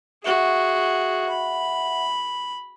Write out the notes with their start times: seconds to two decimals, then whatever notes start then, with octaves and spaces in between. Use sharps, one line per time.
0.24 F#4 G#4 E5 F#5
1.29 B5